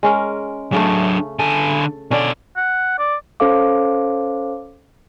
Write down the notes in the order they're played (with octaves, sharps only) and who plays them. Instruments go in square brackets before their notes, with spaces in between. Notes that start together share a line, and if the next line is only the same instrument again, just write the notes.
[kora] G#3 C#4 A#4
[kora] C#3 A3 [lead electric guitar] F#3 D4
[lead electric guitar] D3 G#5 [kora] A4
[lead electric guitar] B2 D5 [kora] D3 C#4
[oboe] F#5
D5
[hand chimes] C#4 A4 C5 F5 D6